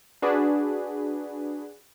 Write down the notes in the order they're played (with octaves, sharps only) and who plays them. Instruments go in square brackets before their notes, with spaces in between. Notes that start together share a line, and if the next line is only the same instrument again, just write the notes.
[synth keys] D4 F#4 G#4 B4